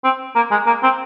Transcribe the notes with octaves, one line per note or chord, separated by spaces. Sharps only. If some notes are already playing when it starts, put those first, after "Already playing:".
C4
A#3
G#3
A#3
C4